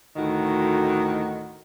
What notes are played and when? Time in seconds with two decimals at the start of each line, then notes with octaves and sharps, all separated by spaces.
0.16 D2 A2 D#3 F#4